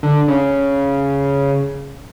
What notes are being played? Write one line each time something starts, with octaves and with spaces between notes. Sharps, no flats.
D3
C#3